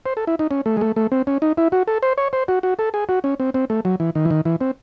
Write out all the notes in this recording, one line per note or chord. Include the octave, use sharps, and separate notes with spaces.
C5
A4
E4
D#4
C#4
A3
G#3
A3
A3
C4
C#4
D#4
E4
F#4
A4
C5
C#5
C5
F#4
F#4
A4
G#4
F#4
C#4
C4
C4
A3
F#3
E3
D#3
E3
D#3
E3
C4